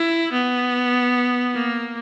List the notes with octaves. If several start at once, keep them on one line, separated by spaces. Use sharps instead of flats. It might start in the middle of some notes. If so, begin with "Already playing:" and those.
Already playing: E4
B3
A#3